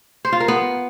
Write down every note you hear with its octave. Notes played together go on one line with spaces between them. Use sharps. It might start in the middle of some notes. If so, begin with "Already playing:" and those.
C5
F4
A#4
B3